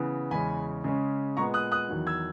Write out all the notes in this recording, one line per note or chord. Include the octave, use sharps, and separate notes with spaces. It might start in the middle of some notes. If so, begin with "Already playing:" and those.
Already playing: C#3 E3 B3
E2 C#3 G#3 C#4 G#5 B5
C#3 G#3 C#4
A#2 G#3 B3 A#5 C#6
D#6 F#6
D#6 F#6
E2 D#3 F#3
E6 G#6